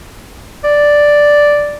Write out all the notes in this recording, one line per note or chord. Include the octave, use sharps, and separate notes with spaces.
D5